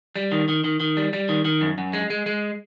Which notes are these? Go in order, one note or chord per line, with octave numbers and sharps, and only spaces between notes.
G3
D#3
D#3
D#3
D#3
G3
G3
D#3
D#3
F#2
F#2
G#3
G#3
G#3